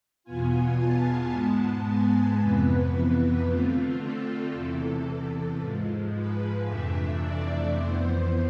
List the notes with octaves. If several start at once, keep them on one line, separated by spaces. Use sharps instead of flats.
E2 B2 B3 F4 G#5
A5
G#2 G#3 B3 A5
G#5
F2 C3 E3 B3 B4
D3 A3 C4 F4
A4
E2 C3 E3 A4
G#2 F3 G#3
B4
F2 C3 E3 A3 D4 E5
D5
F2 E3 B3 C5